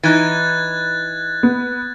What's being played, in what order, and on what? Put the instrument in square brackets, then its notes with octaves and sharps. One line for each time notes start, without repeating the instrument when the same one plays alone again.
[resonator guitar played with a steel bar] E3 D#4 [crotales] F#6 G#6 A6
[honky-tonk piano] B3